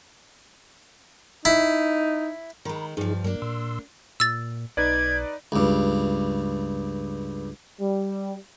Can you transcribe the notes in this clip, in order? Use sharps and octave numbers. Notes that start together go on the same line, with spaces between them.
D#4 E4
D#3 G#3 A#5 B5
G2 F3 D#4 G#4
G2 F#3 A#3 D4
A#2 C6 E6
A#2 E6 A6
B1 D#4 B4 D5 G#6
C#2 G2
G3